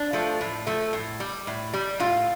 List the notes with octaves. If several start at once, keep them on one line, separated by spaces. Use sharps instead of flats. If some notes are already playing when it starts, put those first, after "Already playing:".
Already playing: D4
F3 A3
A2
F3 A3
A2
G3
A2
G3
A2 F4